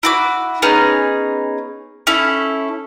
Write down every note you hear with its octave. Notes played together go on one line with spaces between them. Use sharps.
E4 F#4 D6
B3 C#4 D#4 G#4
C#4 E4 A4